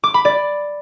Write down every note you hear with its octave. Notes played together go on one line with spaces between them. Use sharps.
D6
B5
D5